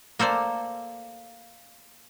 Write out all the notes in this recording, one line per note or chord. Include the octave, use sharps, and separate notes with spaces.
A#3 A4 C5 D5